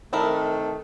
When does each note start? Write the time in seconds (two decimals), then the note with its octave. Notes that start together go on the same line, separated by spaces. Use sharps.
0.13 C3 D#3 A3 D4 E4 A#4